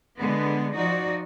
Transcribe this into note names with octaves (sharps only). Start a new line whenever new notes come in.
D3 G#3 B3
F3 D#4 F#4 D5